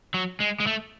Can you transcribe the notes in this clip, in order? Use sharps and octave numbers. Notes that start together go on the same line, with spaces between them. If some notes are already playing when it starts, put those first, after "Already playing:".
F#3
G#3
G#3
A3